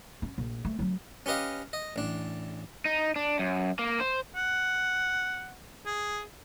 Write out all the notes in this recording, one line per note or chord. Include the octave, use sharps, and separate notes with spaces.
C#4
A#1
A3
F#3 C#4
C#4 G4 B4 D#5 F5
D#5
A1 D4
D#4
D4
F#2
A#3
C5
F#5
G#4